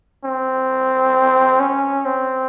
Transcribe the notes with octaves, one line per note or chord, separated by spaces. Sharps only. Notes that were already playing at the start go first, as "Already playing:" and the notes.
C4
C#4
C4